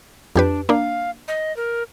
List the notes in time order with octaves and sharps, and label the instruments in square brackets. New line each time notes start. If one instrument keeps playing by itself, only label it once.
[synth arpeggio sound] F2 G4 B4 [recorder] D4
[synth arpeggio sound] A#3 D4 [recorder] F5
[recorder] D#5
A#4